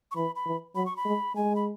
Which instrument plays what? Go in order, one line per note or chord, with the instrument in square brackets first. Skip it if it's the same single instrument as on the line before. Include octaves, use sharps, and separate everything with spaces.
[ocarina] C#6
[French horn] E3 [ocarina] B5
[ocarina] B5
[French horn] E3
[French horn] F#3 [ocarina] B5
[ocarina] C#6
B5
[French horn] G#3
[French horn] G#3 [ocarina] G#5
[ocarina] B5